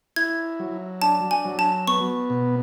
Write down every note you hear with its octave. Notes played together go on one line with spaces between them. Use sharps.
E4 G#6
F#3
D4 A5
G#5
F#3
A5
B3 C#6
B2